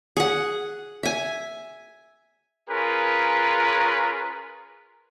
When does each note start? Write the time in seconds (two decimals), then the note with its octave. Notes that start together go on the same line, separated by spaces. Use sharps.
0.17 G#4 F#5
1.03 E5 G#5
2.69 C#4 F4 G#4 A#4 B4